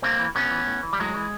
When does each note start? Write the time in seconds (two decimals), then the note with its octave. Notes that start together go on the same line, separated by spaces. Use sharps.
0.02 C3 A#3 C4
0.19 E3
0.35 C3 B3 C#4
0.51 E3
0.67 A2
0.83 E3
0.93 G3
0.99 A2 F#3 G#3
1.16 E3